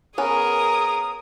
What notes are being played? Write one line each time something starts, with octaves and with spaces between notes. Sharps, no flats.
B3 C#4 G#4 A#4 D#6